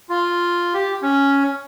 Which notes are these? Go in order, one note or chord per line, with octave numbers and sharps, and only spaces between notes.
F4
G4
C#4